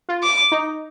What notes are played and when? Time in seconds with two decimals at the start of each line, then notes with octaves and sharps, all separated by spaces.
0.09 F4
0.23 D6
0.52 D#4